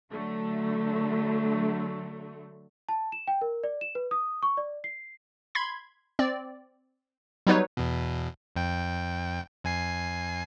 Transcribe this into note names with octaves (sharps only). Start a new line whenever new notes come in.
D3 F#3 A3
A5
E7
G5
A#4
D5
E7
B4
D#6
C#6
D5
C7
B5 C6 G#6
C4 D5
F#3 G3 B3 D#4 B4 C#5
E2 B2
F2 G5
F2 G#5 C7